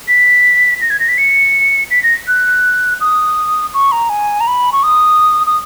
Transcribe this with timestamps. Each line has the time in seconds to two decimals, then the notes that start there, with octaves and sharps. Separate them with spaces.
0.08 B6
0.81 A#6
0.90 G#6
1.00 A#6
1.09 B6
1.18 C#7
1.91 B6
2.03 A#6
2.28 F#6
3.01 D#6
3.74 C#6
3.92 A#5
4.10 G#5
4.41 A#5
4.47 B5
4.72 C#6
4.83 D#6
5.47 D#6